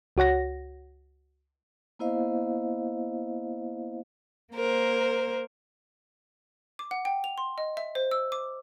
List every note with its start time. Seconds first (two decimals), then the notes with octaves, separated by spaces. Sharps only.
0.17 C#2 F#4 C#5 F#5 A#6
1.99 A#3 B3 E4 C5 D#5 F5
4.54 A#3 A#4 C5
6.79 D6
6.91 F#5
7.05 G5
7.24 F7
7.38 C6
7.58 D#5
7.77 E5
7.95 C5
8.11 E6
8.32 D6